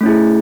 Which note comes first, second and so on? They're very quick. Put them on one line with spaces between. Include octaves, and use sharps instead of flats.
A3 C#4 E4 G#4